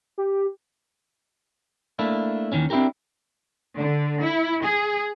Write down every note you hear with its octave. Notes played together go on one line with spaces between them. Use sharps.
G4
A3 A#3 D4 E4
D#2 C3 D#3 E3 C#4
C4 D4 E4 F#4 G4 A#4
D3
E4
G#4